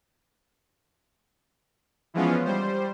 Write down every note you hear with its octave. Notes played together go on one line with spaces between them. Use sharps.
E3 F3 G#3 B3 C#4 F4
G3 C5